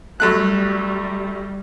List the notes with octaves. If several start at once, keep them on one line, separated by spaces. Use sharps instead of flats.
F#2 G3 A3 F#6